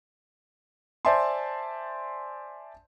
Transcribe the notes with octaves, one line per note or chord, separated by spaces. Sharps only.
C5 D5 E5 G#5 A5 C6